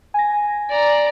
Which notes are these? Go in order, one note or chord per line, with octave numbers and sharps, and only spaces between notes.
G#5 A#6
D5 A#5